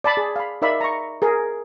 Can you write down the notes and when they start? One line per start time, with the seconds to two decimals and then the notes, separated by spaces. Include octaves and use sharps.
0.04 D5 A5 B5
0.17 G#4
0.36 F5 B5
0.62 D#4 A#4 D5 E5 F5 B5
0.81 A#5 C#6
1.22 G#4 A#4